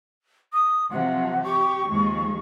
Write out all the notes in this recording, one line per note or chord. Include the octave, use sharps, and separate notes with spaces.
D#6
C3 F3 F#3 F#5
G4 C#6
D#2 F3 G#3